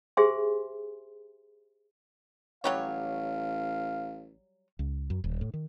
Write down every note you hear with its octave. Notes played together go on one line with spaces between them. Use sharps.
G4 G#4 C5 E5 G#5 C6
A1 F#3 G3 C#5 F5
C#2
F#2
D#1
A2
D#3